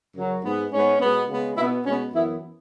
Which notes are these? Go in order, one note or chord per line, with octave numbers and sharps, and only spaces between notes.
F#2 C#3 F#3
G#2 G#3 B3
G#2 G#3 B3 C#4
B2 G#3 B3
C#3 G#3 B3
B2 B3 E4
B2 G#3 B3 C#4
F#2 E3 B3 E4